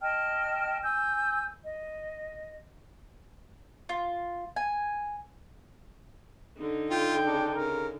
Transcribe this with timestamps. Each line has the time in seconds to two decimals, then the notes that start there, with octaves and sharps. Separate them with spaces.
0.01 D#5 G5 A5 F6
0.84 G#5 E6 G6
1.64 D#5
3.89 F4
4.56 G#5
6.57 D3 D#4
6.90 F4 G5
7.25 C#3 D4
7.55 C#3 A#4